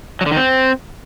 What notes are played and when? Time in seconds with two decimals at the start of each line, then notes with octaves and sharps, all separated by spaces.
0.21 F#3
0.26 D3
0.31 D#3
0.36 C4